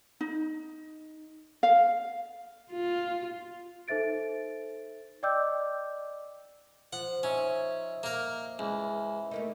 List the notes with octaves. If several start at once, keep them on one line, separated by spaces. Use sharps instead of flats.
D#4
F5
F4
D#4 A4 C5 E5 A6 D7
D5 D#5 G5 D6 E6 G6
F3 F#5
C#4 D#4 E5 C#6
A#3 A#4
C#2 E3
A3 A#3 D#4